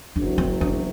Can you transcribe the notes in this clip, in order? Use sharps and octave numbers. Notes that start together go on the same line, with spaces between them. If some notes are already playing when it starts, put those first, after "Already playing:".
F#1 E2 C3 F#3 D4
C4
D4